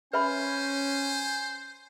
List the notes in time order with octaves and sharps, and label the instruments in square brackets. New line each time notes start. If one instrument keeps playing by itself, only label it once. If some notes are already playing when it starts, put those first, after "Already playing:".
[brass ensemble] C#4 [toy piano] B4 E5 B5 [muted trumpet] C5 [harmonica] G#5